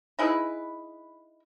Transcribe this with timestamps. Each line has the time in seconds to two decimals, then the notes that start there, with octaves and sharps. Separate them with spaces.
0.19 D#4 E4 G#4 B4